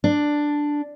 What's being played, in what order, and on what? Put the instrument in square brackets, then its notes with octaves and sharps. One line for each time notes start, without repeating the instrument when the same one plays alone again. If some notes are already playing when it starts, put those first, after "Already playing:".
[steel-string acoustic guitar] D4